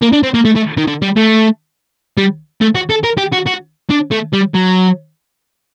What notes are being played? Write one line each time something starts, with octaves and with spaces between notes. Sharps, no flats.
A#3
D4
C4
A#3
A3
A3
D#3
D3
G3
A3
G3
A3
F#4
A4
A#4
G4
F#4
F#4
D4
A3
G3
F#3